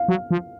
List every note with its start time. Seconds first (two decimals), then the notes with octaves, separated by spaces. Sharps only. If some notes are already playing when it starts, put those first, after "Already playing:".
Already playing: F5
0.08 F#3
0.31 F3